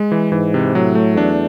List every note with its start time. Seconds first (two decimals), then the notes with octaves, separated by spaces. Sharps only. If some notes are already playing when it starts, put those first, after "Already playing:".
Already playing: G#3
0.12 E3
0.32 G#2 E3
0.54 C3
0.75 A2 F#3
0.95 A3
1.17 E2 D4